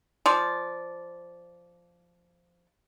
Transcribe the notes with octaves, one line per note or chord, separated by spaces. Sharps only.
F3 D5